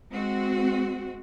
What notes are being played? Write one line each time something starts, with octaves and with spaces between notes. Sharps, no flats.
G#3 C4 F#4